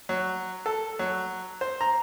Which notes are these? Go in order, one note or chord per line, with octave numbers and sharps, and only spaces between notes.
F#3
A4
F#3
C5
A#5